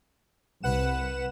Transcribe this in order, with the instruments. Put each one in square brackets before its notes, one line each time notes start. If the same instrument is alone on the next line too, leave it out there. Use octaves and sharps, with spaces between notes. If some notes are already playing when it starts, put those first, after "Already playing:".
[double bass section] C2 [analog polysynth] B4 F#5 E7